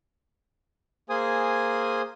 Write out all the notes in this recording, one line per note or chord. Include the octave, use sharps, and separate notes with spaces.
A#3 G#4 C5 G#5 D#6